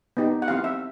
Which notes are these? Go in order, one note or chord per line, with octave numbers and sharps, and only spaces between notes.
B3 D#4 G4
F#5
C4 E4 G4 F5
E5